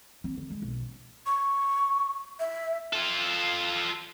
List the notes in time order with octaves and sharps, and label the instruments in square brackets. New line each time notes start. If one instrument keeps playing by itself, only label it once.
[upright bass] C4
D3
G#3
B1
C#3
[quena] C#6
E5
[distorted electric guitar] F4 A4